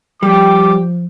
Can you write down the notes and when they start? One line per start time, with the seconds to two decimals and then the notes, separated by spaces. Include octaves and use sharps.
0.23 F3 G3 G4 D6